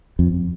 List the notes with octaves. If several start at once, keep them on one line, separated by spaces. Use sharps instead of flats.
F2